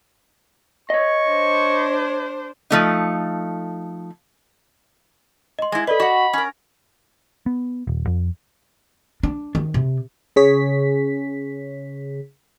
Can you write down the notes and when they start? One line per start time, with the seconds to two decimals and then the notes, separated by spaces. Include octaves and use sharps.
0.90 C#5 D#5 C#6
1.29 D4 C5
2.70 F3 A3 D#4
5.59 D#5 C6
5.72 G#3 E4 A#6
5.87 A4 B4 D5 D#5 B5
6.00 F#4 D#5 F#5
6.33 C#4 A#4
7.46 B3
7.87 D#1
8.07 F2
9.23 D4
9.55 D#3
9.74 C3
10.36 C#3 G#4 C#5 B6